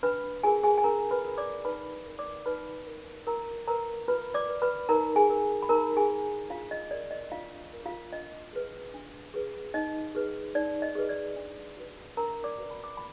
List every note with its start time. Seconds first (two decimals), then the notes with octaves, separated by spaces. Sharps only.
0.03 D4 B4 B5
0.43 F4 G#4 A#4 G#5
0.64 G#4 G#5
0.78 G#5
0.84 D4 A#4 A#5
1.11 B4 B5
1.24 F4 A#4
1.38 D5 D6
1.65 D#4 B4 B5
2.06 A#4
2.19 D5 D6
2.46 D#4 B4 B5
2.87 A#4
3.27 F4 A#4 A#5
3.68 A#4 B4 A#5
4.08 F4 B4 B5
4.34 D5 D6
4.49 B4
4.62 B4 B5
4.89 D#4 A#4 A#5
5.16 G#4 G#5
5.30 A#4
5.62 B5
5.69 D#4 A#4 A#5
5.97 G#4 G#5
6.10 A#4
6.50 D4 F4 F5
6.71 D#5
6.91 F4 A#4 D5
7.11 D#5
7.31 D4 F4 F5
7.72 F4 A#4
7.86 F4 F5
8.12 D4 D#5
8.53 G#4 B4
8.94 D4
9.34 G#4 B4
9.74 D#4 D#5
10.15 G#4 B4
10.55 D#4 D5
10.82 D#5
10.95 G#4 B4
11.09 D5
11.36 D4
11.77 F#4 B4
12.17 D4 A#4 A#5
12.44 D5 D6
12.57 F#4 B4
12.71 B5
12.84 D6
12.97 B5